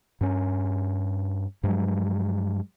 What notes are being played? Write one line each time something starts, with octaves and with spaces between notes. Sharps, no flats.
G2 C#4
G2 F3 F#3 G#3